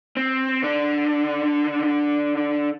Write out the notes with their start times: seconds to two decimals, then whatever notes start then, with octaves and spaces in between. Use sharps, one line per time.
0.17 C4
0.63 D3 D4